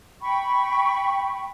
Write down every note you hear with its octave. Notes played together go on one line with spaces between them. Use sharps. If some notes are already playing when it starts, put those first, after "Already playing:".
G5 B5 C#6